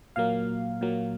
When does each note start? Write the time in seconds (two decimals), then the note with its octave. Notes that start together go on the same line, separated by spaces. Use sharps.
0.16 A#2 F#3 A#3 F5
0.81 A#2 F#3 A#3